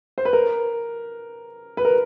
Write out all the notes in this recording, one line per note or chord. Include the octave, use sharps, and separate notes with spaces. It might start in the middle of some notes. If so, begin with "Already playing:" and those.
C5
B4
A#4
B4
A#4